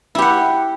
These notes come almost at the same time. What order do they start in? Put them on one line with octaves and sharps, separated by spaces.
E4 G4 F#5